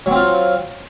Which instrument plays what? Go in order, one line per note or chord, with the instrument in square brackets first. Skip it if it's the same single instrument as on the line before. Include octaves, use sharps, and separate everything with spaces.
[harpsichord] F#3
C4
F4